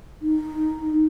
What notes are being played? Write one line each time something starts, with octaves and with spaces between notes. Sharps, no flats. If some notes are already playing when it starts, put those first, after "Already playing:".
D#4